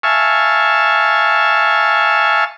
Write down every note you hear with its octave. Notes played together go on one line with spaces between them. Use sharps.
E5 F5 G#5 A5 C#6